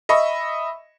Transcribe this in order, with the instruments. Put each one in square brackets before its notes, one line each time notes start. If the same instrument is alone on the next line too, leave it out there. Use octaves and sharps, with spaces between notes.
[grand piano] D#5 E5 B5 C#6